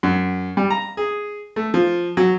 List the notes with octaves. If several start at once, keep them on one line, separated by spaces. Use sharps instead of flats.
F#2
G3
A#5
G#4
A3
F3
F#3